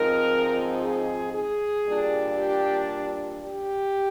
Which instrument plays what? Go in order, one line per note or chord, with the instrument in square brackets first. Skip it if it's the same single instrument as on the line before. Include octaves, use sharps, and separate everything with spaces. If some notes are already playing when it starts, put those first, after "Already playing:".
Already playing: [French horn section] G#2 F3 C4 D#4 A#4
G#4
G#4
A#2 G3 D4
G4
G4